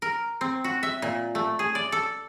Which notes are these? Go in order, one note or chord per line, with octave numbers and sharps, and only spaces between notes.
A#4
C4
F#4
E5
A#2
A3
G#4
D5
A4